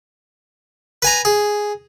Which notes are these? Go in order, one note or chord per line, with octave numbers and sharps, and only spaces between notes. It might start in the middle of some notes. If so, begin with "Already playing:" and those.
B4 G#5 A#5
G#4